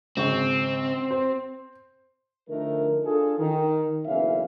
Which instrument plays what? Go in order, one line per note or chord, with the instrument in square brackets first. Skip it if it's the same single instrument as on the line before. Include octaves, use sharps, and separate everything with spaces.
[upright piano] G#1 C#3 C#6 [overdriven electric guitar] C4
[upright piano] C5
[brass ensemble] D3 F3 A3 D#4 A#4
D4 F4 G#4 A4
D#3
F#1 B1 E3 C#4 E5 F5